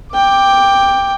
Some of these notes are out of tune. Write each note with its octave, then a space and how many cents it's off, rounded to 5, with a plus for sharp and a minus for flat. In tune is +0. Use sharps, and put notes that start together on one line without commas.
G5 +10 D6 +0